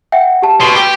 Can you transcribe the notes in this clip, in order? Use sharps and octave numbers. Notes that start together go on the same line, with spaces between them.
E5 F#5 G5
G4 A5
B2 C6 C7 G7
G4